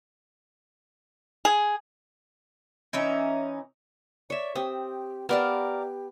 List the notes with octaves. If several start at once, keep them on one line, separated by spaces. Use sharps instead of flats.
G#4
E3 C#4 D#4 E5
C#5 D5 E5
C4 G4 D#6
B3 G4 A#4 D5 F5 A5